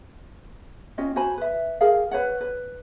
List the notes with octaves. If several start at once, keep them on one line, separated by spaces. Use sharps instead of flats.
C#4 F4 G4 D#5
F#4 C5 G#5 B5
B4 E5
G4 G#4 A#4 F5
B4 C#5 F#5
B4